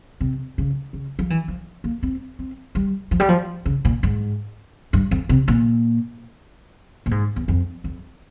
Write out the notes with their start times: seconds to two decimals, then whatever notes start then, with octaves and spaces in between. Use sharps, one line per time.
0.21 C3
0.58 C#3
0.93 C#3
1.19 F3
1.30 E3
1.48 F3
1.84 A#3
2.03 C4
2.39 C4
2.75 G3
3.11 F3
3.20 G3
3.29 F3
3.66 C#3
3.85 A#2
4.03 G#2
4.93 G2
5.11 F2
5.29 C3
5.48 A#2
7.06 A#2
7.11 G#2
7.36 E2
7.48 F2
7.84 F2